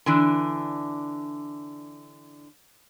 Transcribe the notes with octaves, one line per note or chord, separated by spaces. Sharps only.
D3 E3 D4